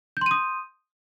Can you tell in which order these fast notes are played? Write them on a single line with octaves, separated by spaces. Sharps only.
G6 C6 D#7 D#6